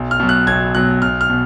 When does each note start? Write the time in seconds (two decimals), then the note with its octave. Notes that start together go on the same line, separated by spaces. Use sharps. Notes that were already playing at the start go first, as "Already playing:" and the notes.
Already playing: B1
0.11 F6
0.20 B2 F#3
0.29 F#6
0.47 B1 G#6
0.75 B2 F#3 F#6
1.02 B1 F6
1.21 F6
1.30 B2